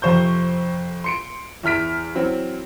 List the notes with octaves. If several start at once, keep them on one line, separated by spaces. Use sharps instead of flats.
F2 C3 C5 C#6 G6
C6 C#7 D7
E2 E4 F6 B6 D7
E3 F#3 C4